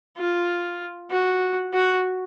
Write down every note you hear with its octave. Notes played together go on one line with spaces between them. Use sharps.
F4
F#4
F#4